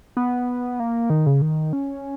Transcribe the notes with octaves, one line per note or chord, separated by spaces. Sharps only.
B3
A#3
D#3
C#3
D#3
C#4